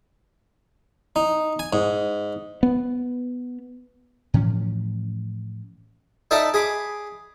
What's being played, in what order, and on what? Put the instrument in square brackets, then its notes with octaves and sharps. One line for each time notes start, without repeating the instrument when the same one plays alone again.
[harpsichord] D#4
G#5
G#2
[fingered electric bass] B3
[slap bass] A2 E3 F3 C#4
[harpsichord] D#4 A4 D5 E5
G#4 B5 D6